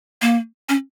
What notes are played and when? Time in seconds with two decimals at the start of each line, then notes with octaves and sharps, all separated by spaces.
0.22 A#3
0.69 C#4